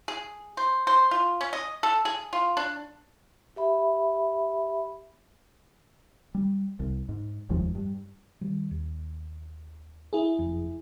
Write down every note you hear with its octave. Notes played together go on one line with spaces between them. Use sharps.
G#4
C5
C5
F4
C#4
D#5
A4
G#4
F4
D4
G4 E5 B5
G3
C2
G#2
F1 D#2 F3 G#3
G2
D#3 G3
D#2
E4 G#4
F#1 F2